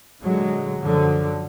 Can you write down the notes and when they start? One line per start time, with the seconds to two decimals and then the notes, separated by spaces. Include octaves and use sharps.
0.23 A#2 D3 F#3 G#3
0.79 F#2 D3 F3 F#3